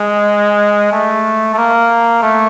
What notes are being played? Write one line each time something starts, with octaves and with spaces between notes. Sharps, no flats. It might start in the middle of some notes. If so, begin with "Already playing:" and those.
Already playing: G#3
A3
A3
A#3
A3